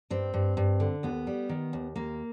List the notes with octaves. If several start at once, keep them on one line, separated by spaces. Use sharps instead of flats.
G2 C4
G2
G2
D3
D#2 B3
G3
D#3
D#2
D#2 A#3